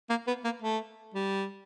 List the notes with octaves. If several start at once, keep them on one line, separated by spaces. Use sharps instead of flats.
A#3
B3
A#3
A3
G3